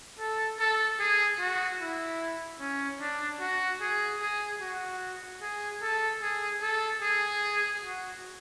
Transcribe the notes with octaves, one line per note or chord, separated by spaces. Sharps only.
A4
A4
G#4
F#4
E4
C#4
D4
F#4
G#4
G#4
F#4
G#4
A4
G#4
A4
G#4
F#4